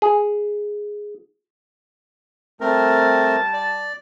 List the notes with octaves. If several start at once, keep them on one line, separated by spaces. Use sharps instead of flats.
G#4
G3 A3 C4 A#4 A5
D5